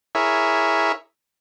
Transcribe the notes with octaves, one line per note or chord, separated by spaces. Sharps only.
E4 G#4 A#4 C#5 E5